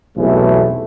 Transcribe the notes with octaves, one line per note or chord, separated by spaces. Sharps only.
B1 E2 C3 E3 A3